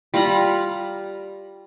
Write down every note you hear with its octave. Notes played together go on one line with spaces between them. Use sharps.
G3 F4 A#5 B5